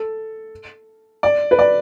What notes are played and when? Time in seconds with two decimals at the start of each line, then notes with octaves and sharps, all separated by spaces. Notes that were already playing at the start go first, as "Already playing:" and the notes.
Already playing: A4
1.23 D5
1.51 B4
1.59 D5